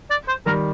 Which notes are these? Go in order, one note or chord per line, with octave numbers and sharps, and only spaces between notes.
D5
C5
D#3 G3 A#4